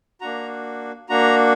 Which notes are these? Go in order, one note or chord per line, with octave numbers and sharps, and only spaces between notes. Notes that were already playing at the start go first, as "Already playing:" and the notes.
A#3 D4 F#4 A#5
A#3 D4 F#4 A#5